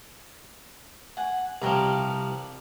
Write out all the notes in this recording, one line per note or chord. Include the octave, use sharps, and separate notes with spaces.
F#5 G#5
C2 F3 G4 A#4 B4